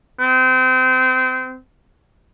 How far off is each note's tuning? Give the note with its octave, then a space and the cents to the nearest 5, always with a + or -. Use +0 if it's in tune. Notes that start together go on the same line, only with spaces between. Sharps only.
C4 -30